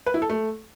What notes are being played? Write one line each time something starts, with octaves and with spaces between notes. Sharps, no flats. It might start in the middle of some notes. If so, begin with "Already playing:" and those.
B4
E4
A4
A3